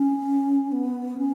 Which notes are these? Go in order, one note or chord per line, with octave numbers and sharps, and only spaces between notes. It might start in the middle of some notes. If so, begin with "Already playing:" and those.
Already playing: C#4
B3
C#4